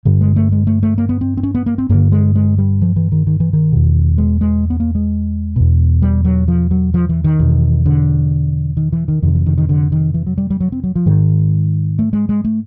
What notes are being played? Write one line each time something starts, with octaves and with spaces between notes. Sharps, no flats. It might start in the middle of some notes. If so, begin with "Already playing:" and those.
G2 D3 G3
G#3
A3
G#3
A3
A3
A#3
B3
C4
C4
C#4
B3
A#3
C4
G2 D3 A#3
G#3
G#3
G3
F3
E3
D#3
D#3
E3
D#3
E2 B2
G#3
G#3
B3
A#3
G#3
E2 B2
G3
F#3
F3
F#3
F3
E3
D#3
E2 B2
D3
D#3
E3
D#3
F2 C3 D#3
E3
D#3
D#3
D3
D#3
E3
F#3
G3
G3
F#3
C4
F#3
F3
G#2 D#3
A3
G#3
G#3
A3